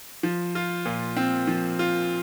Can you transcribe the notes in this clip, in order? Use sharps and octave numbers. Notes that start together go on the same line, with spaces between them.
F3
F4
A#2
C4
F3
F4